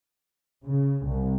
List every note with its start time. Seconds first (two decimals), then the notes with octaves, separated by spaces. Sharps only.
0.65 C#3
1.06 C2